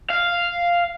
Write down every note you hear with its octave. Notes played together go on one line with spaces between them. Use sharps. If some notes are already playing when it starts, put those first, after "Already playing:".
F5